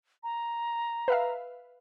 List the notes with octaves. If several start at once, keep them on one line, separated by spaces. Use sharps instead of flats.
A#5
B4 E5 F5